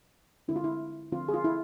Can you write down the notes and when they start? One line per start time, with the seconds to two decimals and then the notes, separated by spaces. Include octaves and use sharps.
0.48 D3 G#3 C4 E4
0.56 F4
0.64 E4
1.12 D3 F3 A3 C4 F4
1.29 G#4
1.34 F4
1.44 E4